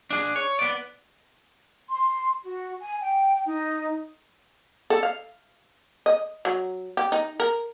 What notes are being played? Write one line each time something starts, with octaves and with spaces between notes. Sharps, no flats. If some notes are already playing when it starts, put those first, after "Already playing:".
D4 G#4
C#5
B3 D5
C6
F#4
G#5
G5
D#4
A4
F5
D#5
F#3
G4
D#4
A#4